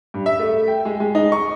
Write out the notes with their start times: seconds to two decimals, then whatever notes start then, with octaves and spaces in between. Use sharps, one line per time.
0.14 G2
0.26 E5
0.39 A3
0.68 G5
0.85 G#3
1.00 G#3
1.15 D#4
1.32 C#6